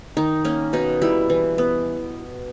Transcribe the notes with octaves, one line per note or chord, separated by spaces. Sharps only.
D#3 D#4
A#3 C#4
B2 D#4
G3 E4
E3
B3